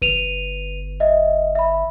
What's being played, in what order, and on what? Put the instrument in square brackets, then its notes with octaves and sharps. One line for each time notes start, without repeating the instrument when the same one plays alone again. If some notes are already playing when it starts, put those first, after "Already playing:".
[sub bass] G1 [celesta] B4 D#7 F7
[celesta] D#5 E5
E5 B5